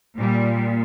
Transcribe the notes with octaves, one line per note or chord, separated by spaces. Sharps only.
A#2 G3